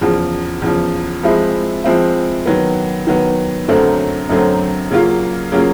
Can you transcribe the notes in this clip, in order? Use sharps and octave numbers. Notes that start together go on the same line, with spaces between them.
E2 C#3 F3
E2 C#3 F3
F3 G#3 C4 E4
F3 G#3 C4 E4
D#3 F#3 B3
D#3 F#3 B3
F#2 D3 F#3 A3 C4
F#2 D3 F#3 A3 C4
C#3 F#3 A#3 C#4 F4
C#3 F#3 A#3 C#4 F4